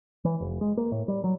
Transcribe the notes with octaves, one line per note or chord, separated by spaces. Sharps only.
E3
F1
G#3
A#3
A2
G3
F#3